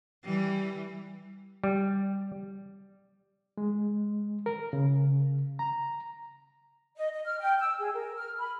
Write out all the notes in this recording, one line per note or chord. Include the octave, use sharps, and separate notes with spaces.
E3 G3
G3
G#3
A#4
C#3
A#5
D#5
D#5
F6
G5
E6
G#4
A#4
F6
B5